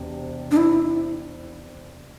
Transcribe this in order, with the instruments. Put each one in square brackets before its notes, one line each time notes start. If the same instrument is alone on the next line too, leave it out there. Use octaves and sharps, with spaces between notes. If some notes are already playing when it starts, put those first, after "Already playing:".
Already playing: [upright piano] E1 C3
[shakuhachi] D4
E4